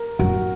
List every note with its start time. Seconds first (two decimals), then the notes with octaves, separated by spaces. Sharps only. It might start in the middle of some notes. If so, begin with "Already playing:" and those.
Already playing: A#4
0.19 F#2 F#4